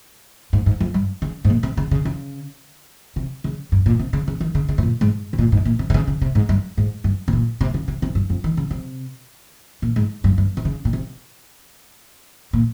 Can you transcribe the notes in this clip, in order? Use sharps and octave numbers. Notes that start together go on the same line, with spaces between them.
G#2
G#2
F2
G2
C#3
G#2
A#2
C3
C#3
C#3
C#3
C3
C#3
G2
A#2
C3
C#3
C#3
D#3
C#3
C#3
G#2
A#2
G#2
C3
A#2
G#2
A#2
C3
C3
C#3
C#3
C3
G#2
G2
G#2
G2
C3
A#2
C3
C#3
C3
C3
G2
F2
D#3
C#3
C3
A#2
G#2
G2
G2
C3
C#3
A#2
C3
A#2